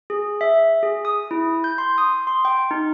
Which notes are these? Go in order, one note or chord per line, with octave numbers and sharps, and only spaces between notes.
G#4
E5
G#4
D#6
E4
G6
C6
D#6
C6
G5
D#4